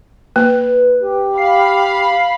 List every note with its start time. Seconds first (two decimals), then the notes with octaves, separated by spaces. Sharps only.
0.36 A#3 B4
0.99 G4
1.38 F5 B5 C7